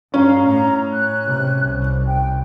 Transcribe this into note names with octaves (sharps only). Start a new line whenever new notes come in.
G2 C#4 F5 A#5
A2 A#5
F#6
C3
C2
G5